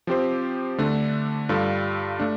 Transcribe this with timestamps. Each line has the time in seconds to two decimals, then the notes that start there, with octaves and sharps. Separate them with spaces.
0.07 F3 C4 G4 C5
0.78 D3 A3 D4
1.49 G2 G3 F4 A4
2.20 A3 D4